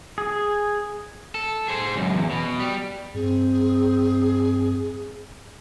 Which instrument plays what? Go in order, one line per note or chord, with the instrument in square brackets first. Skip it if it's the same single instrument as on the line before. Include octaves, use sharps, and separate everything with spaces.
[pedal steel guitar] G#4
[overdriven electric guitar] A4
G#4 C5
C#2 F#2
E2
B2
G3
[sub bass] G2 [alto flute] C4 [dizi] G#4